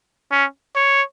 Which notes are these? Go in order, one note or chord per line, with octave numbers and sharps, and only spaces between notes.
C#4
C#5